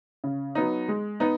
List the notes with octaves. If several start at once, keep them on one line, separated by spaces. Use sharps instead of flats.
C#3
F#3 B3 D#4
G#3
B3 D#4